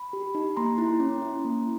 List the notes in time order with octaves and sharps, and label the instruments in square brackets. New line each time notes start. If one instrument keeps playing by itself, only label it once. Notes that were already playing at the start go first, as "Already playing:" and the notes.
Already playing: [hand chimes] B5
G4
D#4
A#3 A#5 C6
E4
C#4
E4
A#3